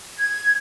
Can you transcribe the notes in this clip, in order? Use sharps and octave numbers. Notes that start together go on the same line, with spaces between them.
G#6